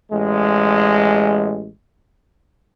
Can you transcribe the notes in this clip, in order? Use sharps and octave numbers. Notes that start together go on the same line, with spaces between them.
A1 G#3